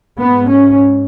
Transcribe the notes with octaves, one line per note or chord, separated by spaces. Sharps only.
G#2 B3
C#4